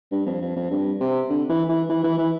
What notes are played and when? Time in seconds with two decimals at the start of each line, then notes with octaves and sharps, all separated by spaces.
0.11 G2
0.26 F2
0.41 F2
0.56 F2
0.71 G2
1.00 C3
1.30 D3
1.50 E3
1.69 E3
1.89 E3
2.04 E3
2.18 E3